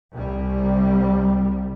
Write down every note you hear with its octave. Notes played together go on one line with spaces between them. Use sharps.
C2 C3 G3